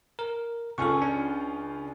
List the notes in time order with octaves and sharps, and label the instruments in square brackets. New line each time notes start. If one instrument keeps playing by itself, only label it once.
[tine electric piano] A#4
[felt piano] C#2 C#4 F4 [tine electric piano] A4 C#6
[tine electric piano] D4